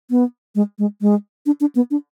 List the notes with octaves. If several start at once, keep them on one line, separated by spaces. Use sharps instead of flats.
B3
G#3
G#3
G#3
D4
D4
B3
D4